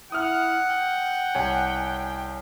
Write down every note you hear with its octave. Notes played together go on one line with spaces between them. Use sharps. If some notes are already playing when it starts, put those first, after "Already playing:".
E4 F#5 D#6 F6
G5
C2 C#5 G#5